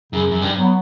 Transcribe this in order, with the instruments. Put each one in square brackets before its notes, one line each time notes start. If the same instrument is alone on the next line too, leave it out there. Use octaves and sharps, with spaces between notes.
[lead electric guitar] F#2 [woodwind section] C#3
[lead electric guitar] F#2
G2
[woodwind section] F#3 B3